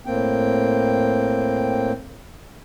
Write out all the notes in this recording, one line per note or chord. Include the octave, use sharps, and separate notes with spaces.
A2 A#3 C4 G5